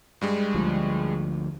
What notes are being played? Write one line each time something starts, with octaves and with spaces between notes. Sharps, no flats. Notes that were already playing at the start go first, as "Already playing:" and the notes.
G2 G3 G#3
D2 F3